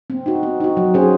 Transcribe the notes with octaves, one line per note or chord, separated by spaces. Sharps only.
C4
D#4 F#4
C4
D#4 F#4
F#3
C#4 G#4 C5